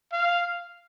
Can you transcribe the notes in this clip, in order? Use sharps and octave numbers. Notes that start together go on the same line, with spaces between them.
F5